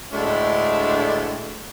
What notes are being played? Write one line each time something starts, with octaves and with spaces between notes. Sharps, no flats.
D2 A2 G#3 A3 D4